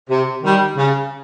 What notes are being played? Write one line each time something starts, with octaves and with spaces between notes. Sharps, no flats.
C3
D#3 G3
C#3